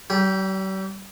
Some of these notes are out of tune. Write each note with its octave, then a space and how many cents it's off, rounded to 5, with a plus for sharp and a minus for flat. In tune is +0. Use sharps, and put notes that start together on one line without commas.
G3 -45 G4 -5